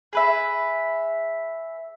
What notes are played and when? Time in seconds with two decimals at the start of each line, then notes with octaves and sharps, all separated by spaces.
0.13 G#4 B4 E5